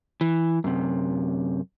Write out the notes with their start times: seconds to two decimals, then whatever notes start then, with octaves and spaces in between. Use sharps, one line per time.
0.21 E3
0.64 F#2 C3